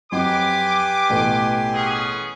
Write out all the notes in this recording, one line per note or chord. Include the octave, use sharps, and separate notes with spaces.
F2 F#3 G4 B4 D#5 G#5 C6 D6
A1 B2 A3
B3 C#4 G#4